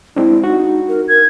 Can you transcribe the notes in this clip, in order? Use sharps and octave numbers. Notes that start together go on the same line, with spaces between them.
G#3 C4 D4 E4
D#4 F#4
A#4
A#4 G#6